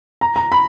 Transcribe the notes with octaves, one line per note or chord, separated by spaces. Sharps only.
A#5
A#5
B5